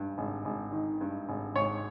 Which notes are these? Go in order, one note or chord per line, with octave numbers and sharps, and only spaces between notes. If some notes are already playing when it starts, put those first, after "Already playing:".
Already playing: G2
G#1
G#1
D#3
G2
G#1
G#1 C#5